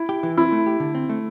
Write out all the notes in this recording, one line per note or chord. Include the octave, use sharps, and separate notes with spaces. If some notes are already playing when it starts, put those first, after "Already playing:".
Already playing: E4
G4
E3
C4 E4
A3
G4
D3
C4
A3